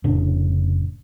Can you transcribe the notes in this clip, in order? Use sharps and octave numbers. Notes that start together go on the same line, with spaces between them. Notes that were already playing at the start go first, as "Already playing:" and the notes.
F1 A2 C#3 D4